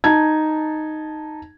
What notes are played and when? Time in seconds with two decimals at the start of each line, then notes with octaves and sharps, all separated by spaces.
0.04 D#4 A5 G#6